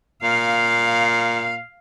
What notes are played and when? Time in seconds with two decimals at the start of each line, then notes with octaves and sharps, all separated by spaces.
0.23 A#2 F5